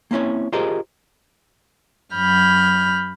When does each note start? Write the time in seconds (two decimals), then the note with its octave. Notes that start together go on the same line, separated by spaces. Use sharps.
0.11 A#3 C4 C#4 E4 C#5
0.53 F4 G4 G#4 A#4 C5 D#5
2.14 F#2 F#3 B5 F6 G6